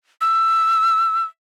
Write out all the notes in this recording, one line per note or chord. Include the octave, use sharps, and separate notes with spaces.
E6